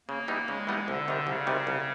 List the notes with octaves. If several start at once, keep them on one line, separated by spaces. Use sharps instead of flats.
C#3 A#3
E3 G3 B3 D#4
C#3 G#3
E3 G3 B3 D#4
C2 D3
C3 D#3 G3
C2 C#3
C3 D#3 G3
C2